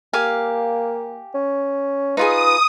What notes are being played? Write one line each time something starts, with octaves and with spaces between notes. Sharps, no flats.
A#3 G4 F5 G#5
C#4
D#4 F4 G#4 B4 D#6